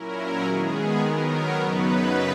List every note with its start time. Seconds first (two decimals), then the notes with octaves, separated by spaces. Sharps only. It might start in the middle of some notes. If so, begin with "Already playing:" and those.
Already playing: A#2 F#3 C#4 E4 A#4
0.44 D#3 G#3 B3 G#4
1.00 D#3 F#3 B3 A#4
1.28 C#5
1.55 F#2 C#3 F#3 B3 D#4 B4